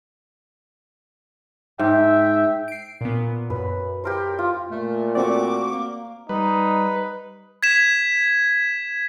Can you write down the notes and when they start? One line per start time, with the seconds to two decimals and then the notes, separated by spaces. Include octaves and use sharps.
1.79 G#2 E5 G5
2.68 C7 D7
3.01 A#2 B3
3.50 F#2 B4
4.04 G4 A#4 C5
4.39 F4
4.71 A#2 A3
5.15 A3 C4 F#4 D5 D6
5.72 A#3
6.29 G3 D#4 B4
7.63 G#6 B6 E7